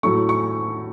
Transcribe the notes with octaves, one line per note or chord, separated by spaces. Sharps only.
A2 F#3 A3 C#6
C#6